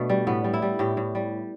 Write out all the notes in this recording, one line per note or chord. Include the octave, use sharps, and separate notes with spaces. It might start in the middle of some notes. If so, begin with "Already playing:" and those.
Already playing: B2 A3 B3 D4
G3
A2 B3
G3
E4
G3
A2 G4
A2
G3